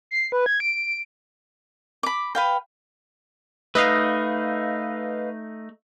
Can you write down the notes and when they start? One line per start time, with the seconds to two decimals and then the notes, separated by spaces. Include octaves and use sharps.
0.11 C7
0.32 B4
0.46 G#6
0.60 D7
2.03 B5 D6
2.35 B4 F5 G5
3.75 A3 D#4 B4 D#5 F5